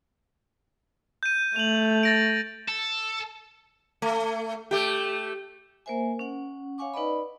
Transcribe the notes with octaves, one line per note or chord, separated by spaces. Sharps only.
G6 D#7
A3 F7 F#7
A6 A#6 D7
A4
A3
A3 G4
A#3 A#4 C5 E5 G#5
C#4 F#5
C#5 F5 F#5 G#5 C#6 D6
D#4 B4 D5 D#5 B5